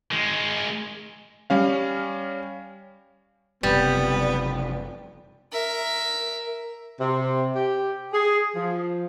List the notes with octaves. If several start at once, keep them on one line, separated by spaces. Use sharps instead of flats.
D#3 G#3
G3 C#4 F5
F#1 C3 G3 B3
A#4 E5
C3
G4
G#4
F3